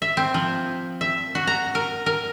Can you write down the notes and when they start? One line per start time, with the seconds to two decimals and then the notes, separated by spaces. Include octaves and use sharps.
0.02 E5
0.17 C4
0.34 F3
1.01 E5
1.35 F#4
1.47 A#5
1.75 A#4
2.06 A#4